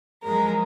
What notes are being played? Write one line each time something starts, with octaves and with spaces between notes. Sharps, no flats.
F#2 F3 G#3 A#4